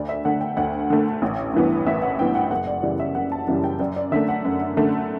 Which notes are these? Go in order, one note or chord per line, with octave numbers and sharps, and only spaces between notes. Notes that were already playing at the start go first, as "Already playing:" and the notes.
Already playing: D2 D5
E5
D3 A3 F#5
G5
D2 F#5
D3 A3
A1
G2 E3 B3
A1 E5
F#5
G2 E3 B3 G5
F#5
G5
F#1 F#5
D5
F#2 C#3 E3 G3 D5
E5
F#1 F#5
A5
F#2 C#3 E3 G3
G5
F#2 D5
D5
D3 A3 E5
F#5
F#2
D3 A3